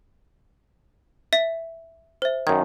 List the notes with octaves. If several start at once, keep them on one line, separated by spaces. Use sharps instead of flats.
E5 B6
C5 E5
F#2 D#3 G#6